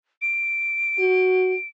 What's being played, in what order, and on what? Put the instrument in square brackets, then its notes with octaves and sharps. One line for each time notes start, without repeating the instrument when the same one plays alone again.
[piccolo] D7
[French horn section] F#4